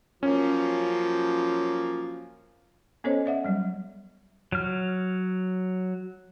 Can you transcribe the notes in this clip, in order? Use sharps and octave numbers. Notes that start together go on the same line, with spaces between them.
F3 F#3 A#3 C#4
B3 C#4 A4 C5 C#5 D#5
D5 E5 F#5
F#3 G3
F#3 F6